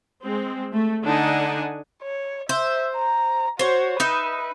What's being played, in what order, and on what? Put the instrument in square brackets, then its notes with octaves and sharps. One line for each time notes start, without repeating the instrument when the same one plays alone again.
[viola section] G#3 C4
A3
D3 D4 D#4 F#5 G#5
[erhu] C#5
[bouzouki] C5 [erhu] E5
[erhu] A#5
[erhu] F#4 [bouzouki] C5 C#5
[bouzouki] D#4 E5 [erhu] B4